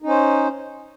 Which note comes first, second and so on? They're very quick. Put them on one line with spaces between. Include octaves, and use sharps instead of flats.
D#4 C#4 C5